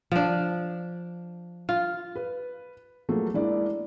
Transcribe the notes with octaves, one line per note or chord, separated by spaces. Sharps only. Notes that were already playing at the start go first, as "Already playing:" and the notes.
F3 D4
F4
B4
F3 F#3 A3 A#3 G#4
G#3 A#3 D4 E4 D5